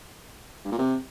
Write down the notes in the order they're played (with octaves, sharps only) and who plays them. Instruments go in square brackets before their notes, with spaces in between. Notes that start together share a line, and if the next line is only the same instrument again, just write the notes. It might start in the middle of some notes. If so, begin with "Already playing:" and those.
[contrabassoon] G2
A#2
C3